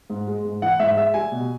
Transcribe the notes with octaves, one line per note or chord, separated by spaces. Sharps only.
G#2
G#3
G#2
E3 F#5
G#2 E5
G#3 E5
G3 G#5
B2